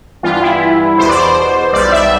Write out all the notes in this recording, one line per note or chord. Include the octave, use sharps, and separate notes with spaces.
G2 E3 G3 B3 F4
F4
E4
E2 B2 B3 C5
D5
C5
B1 B2 G3 D5
E5